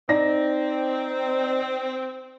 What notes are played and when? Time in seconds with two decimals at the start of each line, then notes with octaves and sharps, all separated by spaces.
0.09 C4 D#4 D5 A#6